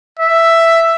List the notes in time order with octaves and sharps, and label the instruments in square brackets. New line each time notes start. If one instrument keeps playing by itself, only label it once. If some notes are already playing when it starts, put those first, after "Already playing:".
[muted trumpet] E5